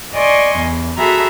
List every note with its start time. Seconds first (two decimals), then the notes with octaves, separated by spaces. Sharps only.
0.15 D5 D#5 G#5 C6 C#6
0.59 E2
0.98 F#4 G#4 A4 E5 A#5 B5